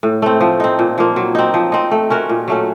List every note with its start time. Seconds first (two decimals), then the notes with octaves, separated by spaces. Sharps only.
0.03 A2
0.22 A3 C4
0.40 F3
0.60 C4 D#4
0.79 A#2
0.98 F3 A#3
1.16 F#3
1.35 C4 D#4
1.54 F3
1.72 C4 D#4
1.91 A3
2.10 C#4 F#4 A#4
2.29 A#2
2.48 F#3 A3 C#4